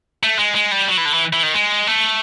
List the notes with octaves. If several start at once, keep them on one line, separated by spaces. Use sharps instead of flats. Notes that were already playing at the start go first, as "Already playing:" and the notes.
A3
G#3
G#3
G3
F#3
E3
D3
E3
E3
D#3
G#3
A3